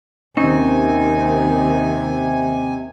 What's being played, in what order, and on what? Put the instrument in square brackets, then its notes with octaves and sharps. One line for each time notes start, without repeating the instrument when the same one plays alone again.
[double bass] D#2 D#3 [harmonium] C3 G#5 [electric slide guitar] C4 D#4 [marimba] C#4